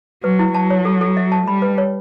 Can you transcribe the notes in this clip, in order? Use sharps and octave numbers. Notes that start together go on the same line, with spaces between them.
F#3 B4
E4
F#3 A5
C#5
A4
A4
E5
A5
G3 B5
B4
C#5